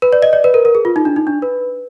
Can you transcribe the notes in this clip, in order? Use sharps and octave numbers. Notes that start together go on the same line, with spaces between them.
B4
D5
D#5
D5
B4
A#4
A#4
G#4
F4
D#4
D4
D#4
D4
B4